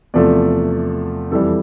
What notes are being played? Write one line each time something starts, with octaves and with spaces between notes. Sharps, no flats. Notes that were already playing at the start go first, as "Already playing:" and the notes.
E2 C3 F3 A3 D5
F2 E3 G3 A4